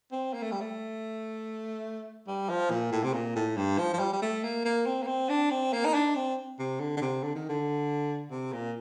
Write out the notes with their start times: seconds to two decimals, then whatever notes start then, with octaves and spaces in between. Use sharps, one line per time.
0.12 C4
0.33 A#3
0.42 A3
0.52 G3
0.61 A3
2.27 G3
2.49 F3
2.70 A#2
2.92 A2
3.04 C3
3.13 A#2
3.36 A2
3.57 G2
3.78 F3
3.93 F3
3.99 G3
4.13 G3
4.22 A3
4.43 A#3
4.65 A#3
4.86 C4
5.03 A#3
5.07 C4
5.29 D4
5.50 C4
5.73 A#3
5.85 D#4
5.94 D4
6.16 C4
6.59 C3
6.80 D3
6.97 D3
7.01 C3
7.23 D3
7.35 D#3
7.49 D3
8.31 C3
8.53 A#2